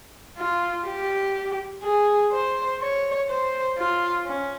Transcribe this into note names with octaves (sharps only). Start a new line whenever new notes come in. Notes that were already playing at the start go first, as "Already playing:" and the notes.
F4
G4
G#4
C5
C#5
C5
F4
C#4